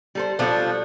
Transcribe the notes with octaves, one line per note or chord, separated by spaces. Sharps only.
G3 A4 C5
B2 F3 G3 D4 A4